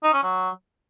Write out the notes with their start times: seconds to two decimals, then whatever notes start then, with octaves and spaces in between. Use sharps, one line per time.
0.04 D#4
0.13 C#4
0.23 F#3